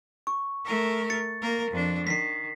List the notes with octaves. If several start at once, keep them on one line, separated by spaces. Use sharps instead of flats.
C#6
A3 A#4
A6 C#7
A#3 A#4
F2 D4
D#3 B6 C7